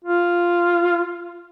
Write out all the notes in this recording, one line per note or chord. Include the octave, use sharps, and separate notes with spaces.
F4